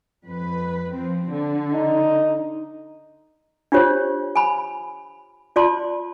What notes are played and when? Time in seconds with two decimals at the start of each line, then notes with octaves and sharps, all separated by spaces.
0.24 F2 B4
0.93 F3 C4
1.29 D3
1.74 D#4
3.72 D4 F4 G4 C5 C#5
4.36 G#5 B5
5.56 F4 D5 A5 C6